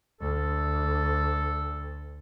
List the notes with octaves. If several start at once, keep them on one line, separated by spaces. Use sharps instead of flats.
D2 A4